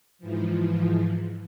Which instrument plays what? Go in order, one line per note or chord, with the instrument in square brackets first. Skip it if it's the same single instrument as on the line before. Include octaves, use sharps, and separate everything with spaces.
[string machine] G#2 E3 F3